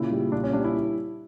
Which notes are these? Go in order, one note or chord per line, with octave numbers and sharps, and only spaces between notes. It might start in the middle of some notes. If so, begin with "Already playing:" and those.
Already playing: A#2 C#3 E4
G3
A#2 D4
C#4
G3 D4
E4